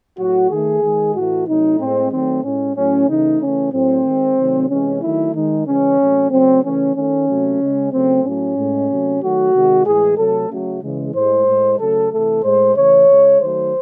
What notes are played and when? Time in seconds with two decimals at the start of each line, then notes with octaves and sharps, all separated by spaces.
0.19 A2 F#3 A3 F#4
0.51 D#3 A3 G#4
0.83 D#3 G#3
1.15 A2 E3 A3 F#4
1.47 C3 F#3 A3 D#4
1.80 A2 G#3 C4
2.12 D#3 F#3 A3 C4
2.44 A2 G#3 C#4
2.76 A2 F#3 A3 C#4
3.09 C#3 E3 A3 D#4
3.41 C#3 E3 A3 C#4
3.73 A2 F#3 A3 C4
4.05 D#3 G#3
4.38 C3 D#3 F#3 A3
4.70 C3 E3 G#3 C#4
5.02 D#3 F#3 A3 E4
5.34 D#3 G#3 D#4
5.67 C#3 E3 G#3 C#4
5.99 C3 F#3 A3
6.32 C#3 F#3 A3 C4
6.64 C#3 E3 A3 C#4
6.96 D#3 A3 C#4
7.28 C3 F#3 A3
7.60 C#3 G#3
7.92 C#3 F#3 A3 C4
8.24 A2 F#3 A3 C#4
8.57 A2 G#3
8.90 C3 F#3 A3
9.22 D#3 F#3 A3 F#4
9.54 C3 D#3 G#3
9.86 A2 E3 G#3 G#4
10.18 C3 F#3 A3 A4
10.50 C#3 F#3 A3
10.83 C#3 E3 G#3
11.15 A2 G#3 C5
11.47 A2 G#3
11.79 C#3 F#3 A3 A4
12.12 C3 E3 A3 A4
12.44 A2 G#3 C5
12.76 C#3 E3 A3 C#5
13.09 C#3 G#3
13.40 D#3 F#3 A3 C5